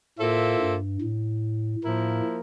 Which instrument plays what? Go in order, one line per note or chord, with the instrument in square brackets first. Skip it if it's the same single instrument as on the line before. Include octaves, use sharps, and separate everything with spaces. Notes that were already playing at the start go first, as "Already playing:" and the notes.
[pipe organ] A2 [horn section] A#3 F4 A4 C5 E5
[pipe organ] G2
A2
[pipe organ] A2 [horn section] F3 A#3 E4 A#4